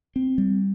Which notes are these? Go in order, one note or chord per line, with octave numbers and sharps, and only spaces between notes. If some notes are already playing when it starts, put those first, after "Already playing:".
C4
G3